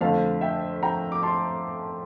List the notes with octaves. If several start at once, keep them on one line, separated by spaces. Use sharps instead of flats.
F2 D3 A3 F5 A5
E5 G5
G5 A#5
D6
A5 C6